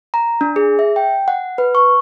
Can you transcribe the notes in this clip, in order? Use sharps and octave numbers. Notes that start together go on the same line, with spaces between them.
A#5
D4
G#4
E5
G5
F#5
B4
C#6